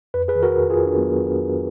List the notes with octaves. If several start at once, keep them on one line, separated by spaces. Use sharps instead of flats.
F2 B4
G#4 B4
D#3
F#4 A#4
F2
F4 G#4
F2
D4
F#3 B3